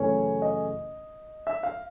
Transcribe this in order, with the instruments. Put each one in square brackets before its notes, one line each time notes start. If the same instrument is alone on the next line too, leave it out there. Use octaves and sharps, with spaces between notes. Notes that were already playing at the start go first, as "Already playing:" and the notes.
Already playing: [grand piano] F#2 C#3 E3 A3 C#4 C#5
D#5
E5
F5